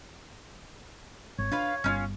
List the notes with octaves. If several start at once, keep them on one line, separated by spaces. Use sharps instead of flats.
G#1 C#5
D4 F4 B4 F5
G1 C#4 D#4 F4